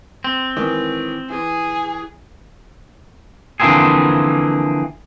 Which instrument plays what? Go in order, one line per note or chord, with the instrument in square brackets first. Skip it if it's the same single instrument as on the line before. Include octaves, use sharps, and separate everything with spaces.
[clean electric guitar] C4
[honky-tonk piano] D#3 E3 G#3
[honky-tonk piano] E3 [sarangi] G#4
[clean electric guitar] D3 E3 F3 A#3 C4 G#4